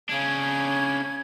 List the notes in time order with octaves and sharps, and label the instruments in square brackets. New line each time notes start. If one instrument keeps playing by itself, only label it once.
[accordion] C#3 [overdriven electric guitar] C#4 D4 [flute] G#6